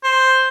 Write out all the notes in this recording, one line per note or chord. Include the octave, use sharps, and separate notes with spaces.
C5